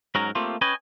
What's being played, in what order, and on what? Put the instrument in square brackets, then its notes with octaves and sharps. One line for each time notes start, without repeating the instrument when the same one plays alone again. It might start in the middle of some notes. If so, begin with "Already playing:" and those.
[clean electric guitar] G#2 F#3 C#4 A#4 A#5
A3 A#3 C4 F4 G4
C#4 B4 C#5 D#5 G5 G#5